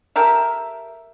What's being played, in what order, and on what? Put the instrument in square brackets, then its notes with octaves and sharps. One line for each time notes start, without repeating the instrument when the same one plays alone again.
[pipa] G4 A4 A#4 E5